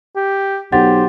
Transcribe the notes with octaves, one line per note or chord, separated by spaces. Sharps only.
G4
B1 G4 C5 F#5 A6